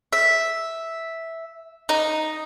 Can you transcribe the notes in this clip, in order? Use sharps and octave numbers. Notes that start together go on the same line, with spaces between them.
E5
D#4